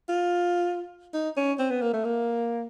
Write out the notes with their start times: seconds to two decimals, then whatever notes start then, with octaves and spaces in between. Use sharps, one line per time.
0.09 F4
1.14 D#4
1.37 C#4
1.59 C4
1.70 B3
1.82 A#3
1.93 A3
2.04 A#3